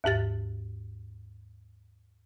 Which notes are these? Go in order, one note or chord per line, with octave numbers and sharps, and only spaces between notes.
D#2 G#2 G4 A6